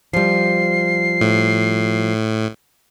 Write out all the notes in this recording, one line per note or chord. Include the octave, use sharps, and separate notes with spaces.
F3 G3 C7
A2